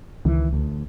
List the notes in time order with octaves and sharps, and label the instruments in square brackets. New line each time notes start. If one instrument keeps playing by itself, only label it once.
[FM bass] C#2 [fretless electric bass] D#3 E3
[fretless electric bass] D2